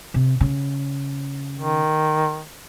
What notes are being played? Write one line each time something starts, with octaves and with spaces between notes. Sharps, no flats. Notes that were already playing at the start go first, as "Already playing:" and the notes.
C3
C#3
D#3